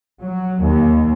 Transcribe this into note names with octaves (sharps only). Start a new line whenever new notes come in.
F#3
D#2